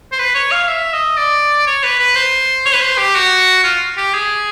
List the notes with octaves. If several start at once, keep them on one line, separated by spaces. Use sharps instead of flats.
C5
B4
C#5
F5
E5
D#5
D5
C#5
B4
B4
C5
C#5
B4
C5
G4
F#4
F4
G4
G#4